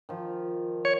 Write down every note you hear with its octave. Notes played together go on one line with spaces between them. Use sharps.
D#3 F3
C#5